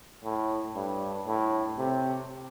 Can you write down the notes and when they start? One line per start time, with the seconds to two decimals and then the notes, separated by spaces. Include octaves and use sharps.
0.24 A2
0.75 G2
1.27 A2
1.78 C3